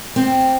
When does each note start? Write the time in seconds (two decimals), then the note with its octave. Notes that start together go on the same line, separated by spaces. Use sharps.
0.16 C4